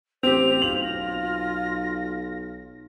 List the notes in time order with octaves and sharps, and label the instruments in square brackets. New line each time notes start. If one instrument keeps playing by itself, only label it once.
[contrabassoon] A1 [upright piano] C4 G4 [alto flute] C5 [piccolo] F7
[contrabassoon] B1 [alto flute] F4 [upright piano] F#7
[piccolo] A#6